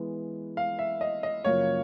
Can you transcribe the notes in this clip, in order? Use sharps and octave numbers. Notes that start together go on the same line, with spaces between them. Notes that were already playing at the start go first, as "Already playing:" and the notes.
Already playing: E3 G#3 B3
F5
E5
D#5
D#5
F#2 C#3 F3 A#3 C#5